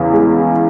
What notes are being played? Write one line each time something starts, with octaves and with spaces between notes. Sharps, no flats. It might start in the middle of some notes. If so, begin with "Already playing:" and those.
Already playing: E2 C#3
G#3